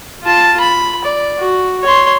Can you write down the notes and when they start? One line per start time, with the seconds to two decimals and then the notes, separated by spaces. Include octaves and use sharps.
0.23 F4 A5
0.60 B5
1.04 D5
1.39 F#4
1.83 C#5 C6